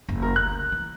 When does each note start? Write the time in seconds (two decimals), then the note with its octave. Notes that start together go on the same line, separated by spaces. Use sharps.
0.09 F#1 E2
0.22 A#4
0.36 D2 F#6
0.72 E3